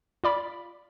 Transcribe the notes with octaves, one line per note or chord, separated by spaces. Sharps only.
F4 D5 B5